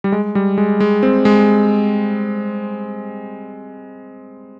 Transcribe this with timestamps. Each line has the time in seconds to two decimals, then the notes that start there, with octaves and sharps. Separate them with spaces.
0.04 G3
0.12 G#3
0.35 G3
0.58 G#3
0.80 G#3
1.03 C4
1.25 G#3